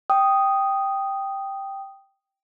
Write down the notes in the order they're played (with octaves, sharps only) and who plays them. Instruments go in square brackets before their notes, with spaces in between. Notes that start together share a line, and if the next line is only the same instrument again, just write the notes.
[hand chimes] G5 D#6